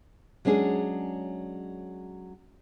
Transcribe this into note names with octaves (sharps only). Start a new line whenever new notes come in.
F#3 G#3 C#4 D4 G#4